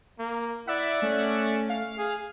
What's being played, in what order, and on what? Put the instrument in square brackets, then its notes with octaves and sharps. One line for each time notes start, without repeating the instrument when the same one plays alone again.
[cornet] A#3
[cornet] E4 [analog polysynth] D5 E5 F#5 [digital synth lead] B6
[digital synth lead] A3 [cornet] C#4
[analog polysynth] F5
[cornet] G#4